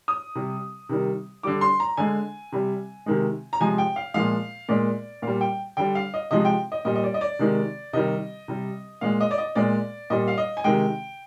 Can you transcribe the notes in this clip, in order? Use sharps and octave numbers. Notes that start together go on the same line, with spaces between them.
D#6
C3 G3
C3 D#3 G3
D3 G3 D6
C6
A#5
D3 G#3 G#5
C3 G3
C3 D#3 G#3
A#5
C3 F3 G#3 G#5
G5
F5
A#2 F3 G#3 F5
A#2 G#3 D5
A#2 G3 F5
G5
D3 G3 G5
F5
D#5
C3 F3 G#3 D#5
G5
D#5
A#2 G3 D#5
D#5
D5
D#5
D5
C3 D#3 G#3
C3 D#3 G3 D#5
C3 G3
A#2 G#3 F5
D#5
D5
D#5
A#2 G#3 D5
A#2 G3 D#5
F5
D#5
G#5
C3 D#3 G#3 G5